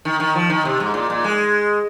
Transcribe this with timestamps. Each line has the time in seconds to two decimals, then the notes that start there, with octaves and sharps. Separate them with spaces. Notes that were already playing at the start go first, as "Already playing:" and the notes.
0.05 D#3
0.20 D#3
0.35 F3
0.50 D#3
0.65 C3
0.80 G#2
0.94 A#2
1.10 A#2
1.24 G#3